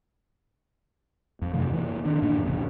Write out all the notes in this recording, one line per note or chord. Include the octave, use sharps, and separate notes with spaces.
F2
F#2 C3 E3 A3
E3 A#3
D#3 D4
F#2 A#2 A#3 D4
F1 A#1 C#3